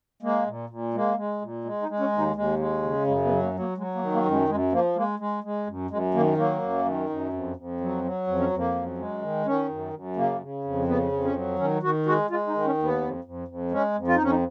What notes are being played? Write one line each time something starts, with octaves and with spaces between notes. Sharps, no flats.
G#3 A#3
A#2
A#2
G#3 A#3
G#3
A#2
G#3
D#4
G#3
C#4
D#2
D#4
D#2 G#3
G#3
C#3
F#2 G#3
B3
F#3
A#3
F#3
A#3
F#3 G#3
A#3
D#3
A#3
F#2
G#3
F#2 G#3
F3 A#3
G#3 A#3
G#3
G#3
F#2
F#2 G#3
D#3 A#3
F#3 A#3
F#2
D#3
F#2
F2
F2
F#3
F#3
F2
C#4
F2
A#3
F#2
G#3
D#3
D#3 C#4
F#2
F#2
C#3 A#3
C#3
F2
C#3 B3
F2
C#4
F#3
D#3 C#4
D#3 F#4
G#3 F#4
G#3 F4
D#4
D#3
C#4
D#2
B3
F2
F2
F2
G#3 C#4
F2
F4
D#4
F2 C#4
D#4